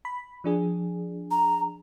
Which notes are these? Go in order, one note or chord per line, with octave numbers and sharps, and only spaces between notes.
B5
F3 D4 G#4
A#5